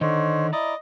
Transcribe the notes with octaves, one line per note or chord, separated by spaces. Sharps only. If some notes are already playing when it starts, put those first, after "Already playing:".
D3 D#3 D#4 C5 C#5
E4 D5 D#5 A#5